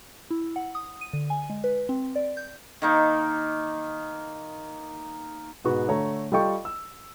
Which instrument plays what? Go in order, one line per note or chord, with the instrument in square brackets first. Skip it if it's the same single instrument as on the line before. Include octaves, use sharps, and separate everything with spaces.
[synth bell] E4
F#5
D#6
D#7
D3
G#5
G#3
B4
C4
D5
G6
[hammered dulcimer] D#3 A#3 D#4
[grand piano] G#2 B2 G#3 B3 F#4
D3 A3 C#5 A#5
G3 F4 A4 D#5 G5 C#6
E6